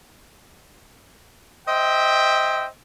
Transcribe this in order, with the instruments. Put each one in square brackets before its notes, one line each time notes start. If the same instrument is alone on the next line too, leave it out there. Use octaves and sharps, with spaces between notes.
[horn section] C5 D#5 E5 G5